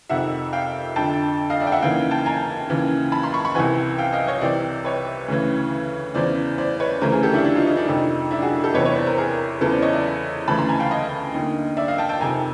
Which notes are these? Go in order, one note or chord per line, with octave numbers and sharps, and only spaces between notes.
F2 C3 D#3 E5 F#5
F5 G5
F2 D3 G5 A5
D#5 F5
D5 E5
G5
E5 F#5
D#2 C#3 E3 F5 G5
G5 A5
G#5 A#5
D#2 C#3 E3
A5 B5
A#5 C6
B5 C#6
B5 C#6
C2 C3 E3 F#5 G#5
F5 G5
D#5 F5
C#5 D#5
C2 C3 E3 C5 D5
B4 C#5
D2 C#3 E3
E2 C#3 E3 C5 D5
C5 D5
B4 C#5
D2 C#3 E3 A#4 C5
G#4 A#4
G4 A4
D4 E4
D4 E4
D#4 F4
D#4
D4
F2 C3 D#3 D#4
D4 E4
F#4 G#4
G4 A4
E2 C3 E3 B4 C#5
B4 C#5
C5 D5
A#4 C5
G#4 A#4
E2 C#3 E3 A4 B4
C5 D5
C#5 D#5
D5 E5
D2 C#3 E3 A5 B5
A#5 C6
G#5 A#5
F5 G5
D#5 F5
D#2 D3
D5 E5
D#5 F5
G5 A5
G5 A5
F2 C3 D#3 G#5 A#5